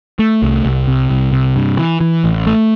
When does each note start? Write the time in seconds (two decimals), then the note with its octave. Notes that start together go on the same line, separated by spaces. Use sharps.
0.19 A3
0.42 C2
0.65 C2
0.88 C3
1.10 C2
1.32 C3
1.56 G2
1.79 E3
2.01 E3
2.24 A1
2.47 A3